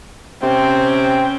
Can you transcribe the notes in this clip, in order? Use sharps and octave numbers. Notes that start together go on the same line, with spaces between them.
C3 C4 C#4 G5